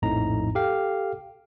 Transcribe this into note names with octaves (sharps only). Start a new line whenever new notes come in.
A#1 F2 A2 D#4 A#5
G4 A4 F5 G5